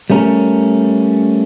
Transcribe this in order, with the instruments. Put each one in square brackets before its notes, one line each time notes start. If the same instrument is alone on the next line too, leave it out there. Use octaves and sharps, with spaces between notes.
[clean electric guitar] G3 A3 C#4 A#4